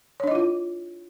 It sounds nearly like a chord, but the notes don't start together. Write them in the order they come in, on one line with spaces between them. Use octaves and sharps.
C#5 D4 D#5 E4 F4